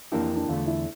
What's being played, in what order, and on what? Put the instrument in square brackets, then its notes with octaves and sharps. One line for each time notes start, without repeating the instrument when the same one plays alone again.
[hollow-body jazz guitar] F2 E3 A#3 E4 G4 [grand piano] D4
[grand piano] D4
[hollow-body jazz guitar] E2 D3 A3 [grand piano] F4
[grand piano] E4